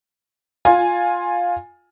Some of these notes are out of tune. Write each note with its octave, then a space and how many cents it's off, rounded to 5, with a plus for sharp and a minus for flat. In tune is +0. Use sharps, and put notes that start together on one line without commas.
F4 +10 G#5 +0